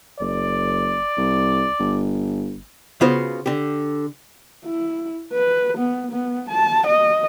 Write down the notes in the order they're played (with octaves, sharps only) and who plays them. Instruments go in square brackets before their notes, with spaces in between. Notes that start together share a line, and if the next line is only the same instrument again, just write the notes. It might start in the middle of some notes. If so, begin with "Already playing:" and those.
[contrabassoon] F#1 [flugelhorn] D5
[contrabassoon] C2
G1
[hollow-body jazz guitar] C#3 B3 F4 F#4 C5
D3 G4
[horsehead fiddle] E4
B4
B3
B3
A5
D#5